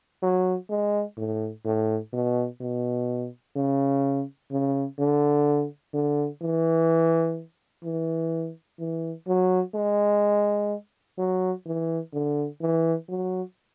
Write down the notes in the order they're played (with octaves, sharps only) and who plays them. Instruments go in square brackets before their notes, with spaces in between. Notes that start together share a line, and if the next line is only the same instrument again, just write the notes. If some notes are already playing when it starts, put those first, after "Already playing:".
[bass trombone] F#3
G#3
A2
A2
B2
B2
C#3
C#3
D3
D3
E3
E3
E3
F#3
G#3
F#3
E3
D3
E3
F#3